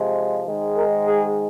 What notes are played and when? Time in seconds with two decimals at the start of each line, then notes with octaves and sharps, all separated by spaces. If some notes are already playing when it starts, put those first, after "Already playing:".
Already playing: C3 F3 G#3
0.47 G#2 D#3 G#3
0.76 A#4
1.05 G#4